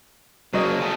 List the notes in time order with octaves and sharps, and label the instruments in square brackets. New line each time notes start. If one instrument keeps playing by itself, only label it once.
[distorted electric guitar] C#3 A#3 [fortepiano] F#3 C5 D#5
[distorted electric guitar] A3 G#4